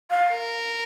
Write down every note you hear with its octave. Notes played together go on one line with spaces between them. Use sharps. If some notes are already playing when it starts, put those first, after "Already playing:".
F5
A#4